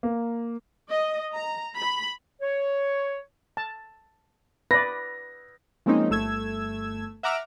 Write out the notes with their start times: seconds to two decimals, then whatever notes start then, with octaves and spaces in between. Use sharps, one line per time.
0.03 A#3
0.89 D#5
1.33 A#5
1.77 B5
2.41 C#5
3.57 A5
4.71 B4 D5 A#6
5.86 F3 G#3 A#3 C4 C#4 D#4
6.10 G1 A3 E6 G#6
7.23 E5 F#5 A#5 D6 E6 F6